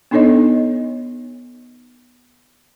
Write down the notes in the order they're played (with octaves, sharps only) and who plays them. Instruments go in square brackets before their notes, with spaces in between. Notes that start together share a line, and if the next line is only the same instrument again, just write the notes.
[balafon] B3 D4 D#4 A4 C#5 D#5